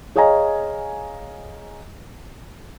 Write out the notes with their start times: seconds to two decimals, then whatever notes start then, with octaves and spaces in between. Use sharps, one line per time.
0.15 G#4 C#5 D#5 F5 G#5 A#5